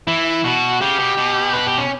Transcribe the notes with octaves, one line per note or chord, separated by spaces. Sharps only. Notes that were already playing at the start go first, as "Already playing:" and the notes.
E3 E4
B2 F#4
C#3 G4
B2
B2
B4
G4
C#4